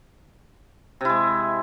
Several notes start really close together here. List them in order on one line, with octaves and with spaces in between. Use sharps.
C3 E4 G#3